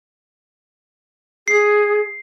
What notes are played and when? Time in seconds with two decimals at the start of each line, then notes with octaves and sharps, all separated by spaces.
1.48 G#4 C7